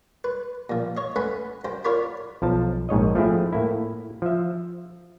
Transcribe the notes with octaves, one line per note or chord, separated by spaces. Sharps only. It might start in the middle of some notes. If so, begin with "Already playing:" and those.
B4
A#2 F3
C#5 D#5
A3 C#4 B4 F#5 B5
F#2 C5 G5
F4 A#4 C#5 D5 B5
B1 F3 A5
A#1 G#2 C#5 D#5
F3 A3 C4 E4 G#4
A2 A#3 E4
F3 E5